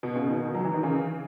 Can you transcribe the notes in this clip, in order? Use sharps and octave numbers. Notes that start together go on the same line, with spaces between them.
B2
C#3
B2 D#3
F#3
E3
D#3
C#3 E3